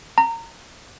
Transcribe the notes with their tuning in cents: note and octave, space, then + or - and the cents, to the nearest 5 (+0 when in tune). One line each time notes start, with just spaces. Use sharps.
A#5 -20